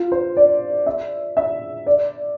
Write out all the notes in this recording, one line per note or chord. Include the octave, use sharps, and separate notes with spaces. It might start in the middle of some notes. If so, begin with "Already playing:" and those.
Already playing: F4
C5
D5
E5
E5
D5